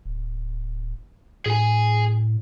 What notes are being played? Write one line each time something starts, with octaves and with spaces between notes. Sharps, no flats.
D1
A2 G#4 G#5